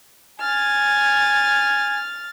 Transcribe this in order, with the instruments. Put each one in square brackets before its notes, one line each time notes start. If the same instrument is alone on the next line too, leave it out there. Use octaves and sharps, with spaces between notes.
[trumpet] G#5 [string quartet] F6 A6